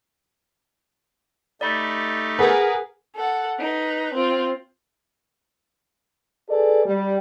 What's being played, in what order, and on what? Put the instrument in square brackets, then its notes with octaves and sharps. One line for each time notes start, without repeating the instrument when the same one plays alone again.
[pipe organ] A3 D#4 G4 [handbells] D5 B5
[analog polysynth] G#4 A#4 [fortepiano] B4 [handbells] F#5
[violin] A4 F#5
D#4 B4
C4 F4
[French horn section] G#4 A4 B4 D5
G3